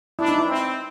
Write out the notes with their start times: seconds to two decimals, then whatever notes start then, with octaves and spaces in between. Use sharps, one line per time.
0.19 D4 E4
0.28 D#4
0.38 E4
0.48 C4